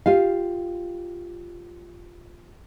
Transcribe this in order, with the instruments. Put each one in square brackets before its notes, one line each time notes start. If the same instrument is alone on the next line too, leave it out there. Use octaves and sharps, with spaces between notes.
[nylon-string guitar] F4 G4 F5